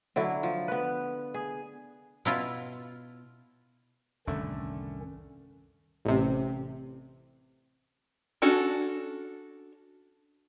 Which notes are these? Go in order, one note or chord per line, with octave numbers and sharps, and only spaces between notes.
D3 F#3 E4
F3
B3 B4
G#4
B2 E4 F4
C2 F#2 A2 D3 D#3 A3 C#4
A1 C3
C#4 D4 F#4 A4